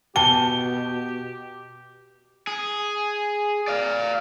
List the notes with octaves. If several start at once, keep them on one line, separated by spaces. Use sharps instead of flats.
B2 G4 G5 A5 G7
G#4
D5 F5